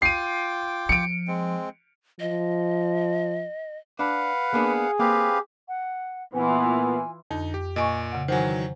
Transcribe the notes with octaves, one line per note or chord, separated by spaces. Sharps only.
F4 G5 D6 C7 D#7
F3 C#7 D7
G#3 C4
F3 D#5
D4 B4 F5 F#5
A#3 B3 D4 G#4
A#3 C4 G4 B4 F5
F#5
A#2 E3 B3 E4 F4 G#5
F2 D3 D#4
G4
A#2 D#5 G#5 C#6 D7
C#3 F#5
D#3 E3 F#3 C5 F#5 G#5